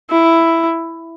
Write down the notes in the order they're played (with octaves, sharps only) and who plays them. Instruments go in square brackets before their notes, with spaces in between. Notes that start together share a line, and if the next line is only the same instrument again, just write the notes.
[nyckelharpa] E4